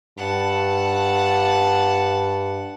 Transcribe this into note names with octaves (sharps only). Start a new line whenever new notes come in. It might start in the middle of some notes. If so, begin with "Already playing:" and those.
G2 F#5 A5